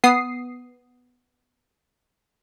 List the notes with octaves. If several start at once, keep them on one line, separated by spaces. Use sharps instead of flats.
B3 D#6 C7